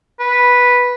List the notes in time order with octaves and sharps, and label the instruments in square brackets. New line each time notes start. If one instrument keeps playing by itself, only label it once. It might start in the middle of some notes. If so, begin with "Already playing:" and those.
[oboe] B4